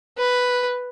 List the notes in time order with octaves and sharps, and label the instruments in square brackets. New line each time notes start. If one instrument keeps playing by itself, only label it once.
[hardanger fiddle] B4